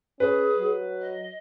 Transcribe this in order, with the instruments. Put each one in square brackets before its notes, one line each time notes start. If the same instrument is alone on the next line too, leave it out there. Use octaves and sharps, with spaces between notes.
[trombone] C#4 [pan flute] G#4 [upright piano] B4
[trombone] F#3
[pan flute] D#5